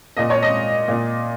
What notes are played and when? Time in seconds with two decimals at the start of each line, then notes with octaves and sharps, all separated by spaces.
0.17 A#2 D#5
0.30 C#5
0.42 D#5
0.88 A#2